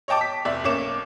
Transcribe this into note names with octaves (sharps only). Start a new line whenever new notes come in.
C#5 D#5 G5 A5 D6
B6
F1 D5 E5 B6
B1 A#3 C#4 C#5 D6 E7